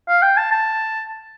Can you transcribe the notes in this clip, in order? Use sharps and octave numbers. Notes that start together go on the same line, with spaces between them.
F5
G5
A5
A5